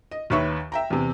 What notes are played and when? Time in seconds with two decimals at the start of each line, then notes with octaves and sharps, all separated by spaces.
0.11 D#5
0.30 D#2 D#3 B4 C#5 E5 C#6
0.72 E5 G5 A#5
0.90 E2 C3